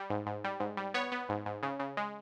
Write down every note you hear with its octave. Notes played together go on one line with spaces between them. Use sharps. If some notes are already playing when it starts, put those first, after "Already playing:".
Already playing: G3
G#2
G#2
G3
G#2
G3
B3 C#5
B3
G#2
G#2
C#3
C#3
G#3